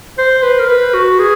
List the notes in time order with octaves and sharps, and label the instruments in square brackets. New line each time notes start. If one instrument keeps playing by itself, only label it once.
[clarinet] C5
B4
A#4
B4
F#4
G#4